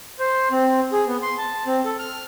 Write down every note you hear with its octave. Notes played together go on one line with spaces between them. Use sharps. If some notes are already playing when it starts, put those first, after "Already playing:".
C5
C4
G#4
B3
C6
A5
C4
A4
F6